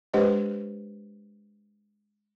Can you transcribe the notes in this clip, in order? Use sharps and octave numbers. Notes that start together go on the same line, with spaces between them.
G#3 D4 G4 B4 C5 D#5